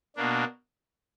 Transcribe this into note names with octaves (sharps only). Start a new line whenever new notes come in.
B2 A#3 D4